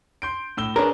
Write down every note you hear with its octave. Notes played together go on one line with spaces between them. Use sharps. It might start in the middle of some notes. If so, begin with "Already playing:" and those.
C6 G6 D7
A2 E6 G7
D4 G#4 A#4 B4 C#5